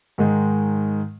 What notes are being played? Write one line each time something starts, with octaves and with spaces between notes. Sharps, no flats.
G#2 D#3 G#3